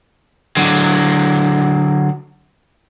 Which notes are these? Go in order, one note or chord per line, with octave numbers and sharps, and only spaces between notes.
D3 F#3